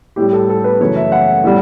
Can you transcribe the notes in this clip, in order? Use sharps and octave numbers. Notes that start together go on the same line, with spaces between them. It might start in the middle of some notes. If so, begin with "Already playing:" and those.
A2 G3 G4
A4
A4
B4
F#2 C#3 E3 A3 C#5
E5
F#5
A2 G3